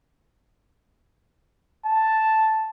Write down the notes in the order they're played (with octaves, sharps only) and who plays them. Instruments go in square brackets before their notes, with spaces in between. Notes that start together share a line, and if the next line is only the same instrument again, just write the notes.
[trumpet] A5